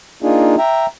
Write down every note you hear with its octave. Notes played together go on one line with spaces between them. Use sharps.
A#3 D4 D#4 F4 G#4
E5 G5 A#5